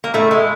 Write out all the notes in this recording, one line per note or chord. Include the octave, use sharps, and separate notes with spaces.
A#3
A2 A3
G#3